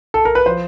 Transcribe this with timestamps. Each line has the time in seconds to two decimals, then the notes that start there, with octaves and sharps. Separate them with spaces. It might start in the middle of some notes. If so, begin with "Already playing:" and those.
0.14 A4
0.25 A#4
0.35 B4
0.46 F3 C5